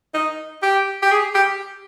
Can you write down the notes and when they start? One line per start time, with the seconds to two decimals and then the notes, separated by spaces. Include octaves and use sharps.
0.14 D#4
0.62 G4
1.02 G4
1.11 G#4
1.35 G4